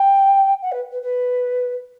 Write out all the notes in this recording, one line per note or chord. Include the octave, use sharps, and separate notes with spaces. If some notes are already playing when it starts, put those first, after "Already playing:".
Already playing: G5
F#5
B4
B4
B4